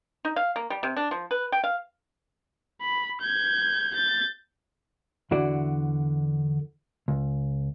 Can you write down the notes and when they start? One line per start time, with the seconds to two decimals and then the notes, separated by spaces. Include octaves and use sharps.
0.25 D#4
0.36 F5
0.56 A#3
0.70 G3
0.83 C3
0.97 D4
1.11 F3
1.31 B4
1.52 G5
1.64 F5
2.81 B5
3.21 G6 G#6
3.94 G6 A6
5.31 E2 D3 E4 F#4 D5
7.08 C#2